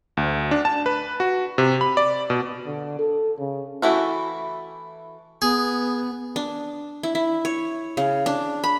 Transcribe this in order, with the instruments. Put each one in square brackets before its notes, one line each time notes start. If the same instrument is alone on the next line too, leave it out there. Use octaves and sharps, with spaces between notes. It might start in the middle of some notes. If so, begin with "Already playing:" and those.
[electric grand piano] D2
D4
A5
B4
F#4
C3
B5
D5
B2
[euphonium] D3
A4
C#3
[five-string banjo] E3 A3 E4 F#4
[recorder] B3 [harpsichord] G#4
[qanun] D4
E4
E4
C#5
C#3
D4
B5